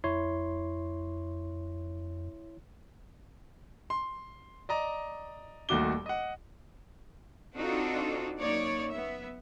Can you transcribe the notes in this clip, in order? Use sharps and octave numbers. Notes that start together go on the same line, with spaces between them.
F2 E4 C#5 C6
C6
D5 D#5 A#5
D#1 D#2 A3 F#4 D6 G7
D#5 F#5
C4 D4 D#4 F4 F#4 A4
F#2 A#3 D#4 C#5 D5
B3 E5